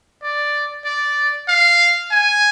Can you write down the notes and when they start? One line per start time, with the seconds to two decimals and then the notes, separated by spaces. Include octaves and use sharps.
0.23 D5
0.85 D5
1.49 F5
2.11 G#5